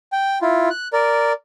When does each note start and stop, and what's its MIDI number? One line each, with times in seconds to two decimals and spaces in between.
0.12 0.38 79
0.42 0.69 64
0.42 0.69 65
0.70 0.88 90
0.93 1.33 70
0.93 1.33 74